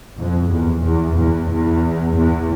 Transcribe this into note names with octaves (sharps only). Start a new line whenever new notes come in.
F2
E2
E2
E2
E2
E2